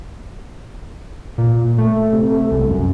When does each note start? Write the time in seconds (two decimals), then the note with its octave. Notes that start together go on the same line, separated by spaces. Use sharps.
1.38 A#2
1.78 A3
2.13 C3
2.30 A3
2.51 C2
2.70 F#2